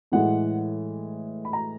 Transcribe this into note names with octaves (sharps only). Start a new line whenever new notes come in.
A2 E3 G#3 F#5
B5
A#5